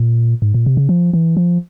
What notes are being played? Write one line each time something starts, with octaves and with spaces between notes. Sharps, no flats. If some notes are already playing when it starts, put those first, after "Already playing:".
Already playing: A#2
G#2
A#2
C3
C#3
F3
E3
F3